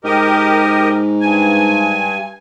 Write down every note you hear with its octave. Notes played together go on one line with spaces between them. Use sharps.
G#2 G4 A#4 D#5
G2 G#5